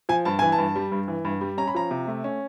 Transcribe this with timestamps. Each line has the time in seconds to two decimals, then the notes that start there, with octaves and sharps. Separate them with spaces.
0.09 F3 G#5
0.25 G2 A5
0.39 E3 G#5
0.52 A5
0.58 G2
0.76 G3
0.92 G2
1.08 E3
1.25 G2
1.41 G3
1.58 C#4 A#5
1.68 B5
1.75 F3 A#5
1.91 C3
2.07 A3
2.24 C#4